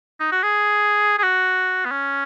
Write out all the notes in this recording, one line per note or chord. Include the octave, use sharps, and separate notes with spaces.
D#4
F#4
G#4
G#4
F#4
B3
C#4